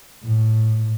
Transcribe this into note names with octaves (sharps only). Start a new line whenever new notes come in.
A2